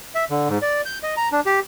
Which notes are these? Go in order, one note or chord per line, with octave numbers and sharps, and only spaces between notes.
E5
D3
G#2
D5
G6
D#5
A#5
D4
G4